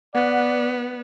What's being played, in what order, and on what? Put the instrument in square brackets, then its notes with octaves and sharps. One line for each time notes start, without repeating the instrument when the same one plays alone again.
[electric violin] B3 [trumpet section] D5 F#5